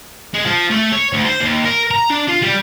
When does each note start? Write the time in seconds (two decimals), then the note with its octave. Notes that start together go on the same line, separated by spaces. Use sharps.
0.34 G#3
0.46 F3
0.70 A3
0.92 C#5
1.13 D2
1.24 C5
1.40 D#2
1.65 A#4
1.91 A#5
2.10 D4
2.28 F4
2.43 G3